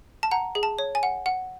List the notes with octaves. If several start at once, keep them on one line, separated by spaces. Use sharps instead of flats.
A5
F#5 A#5
G#4
A5
C#5
G#5
F#5
F#5